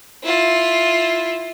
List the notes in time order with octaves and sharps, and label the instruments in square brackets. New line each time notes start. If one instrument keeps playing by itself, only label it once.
[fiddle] E4 F4